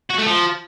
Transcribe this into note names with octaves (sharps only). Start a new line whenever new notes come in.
F#4
A3
F3